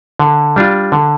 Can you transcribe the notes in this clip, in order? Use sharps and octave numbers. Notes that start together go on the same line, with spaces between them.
D3
G3 D4 F4
D3